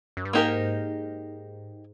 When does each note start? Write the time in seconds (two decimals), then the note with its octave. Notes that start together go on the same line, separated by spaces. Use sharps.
0.17 F#2
0.25 G2
0.33 G#2 A#3 D#4 G4 A#4